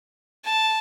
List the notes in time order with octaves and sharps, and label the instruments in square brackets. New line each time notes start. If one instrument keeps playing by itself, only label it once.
[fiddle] A5